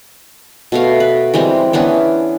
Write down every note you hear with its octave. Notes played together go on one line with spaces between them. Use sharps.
B2 A3 F5
B4
E3 G3 G#3 C4
E3 B3 C#4 D4